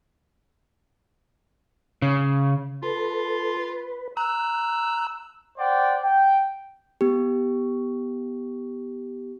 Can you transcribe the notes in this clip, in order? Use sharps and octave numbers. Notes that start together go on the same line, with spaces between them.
C#3
F4 A4 B4
B4
A#5 E6 F#6
C5 D5 F#5 G5
G5
B3 G4